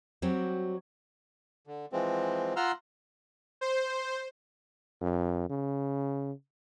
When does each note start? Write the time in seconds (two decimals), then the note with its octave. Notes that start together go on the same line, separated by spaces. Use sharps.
0.22 F#3 G3 C4 F#4 G4
1.67 D3
1.93 E3 F3 G#3 C4
2.56 F4 F#5 A#5 C6 E6 F6
3.61 C5
5.01 F2
5.50 C#3